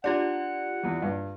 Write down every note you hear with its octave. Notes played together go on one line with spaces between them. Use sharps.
D4 F4 G4 D5 F#5
E2 E3
G2